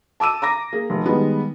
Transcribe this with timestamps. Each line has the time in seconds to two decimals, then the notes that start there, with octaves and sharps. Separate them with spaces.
0.20 A5 D6 E6 D#7
0.42 A#5 D6 A#6
0.73 A#3 G#4
0.90 F1
1.06 D#3 G3 G#3 B3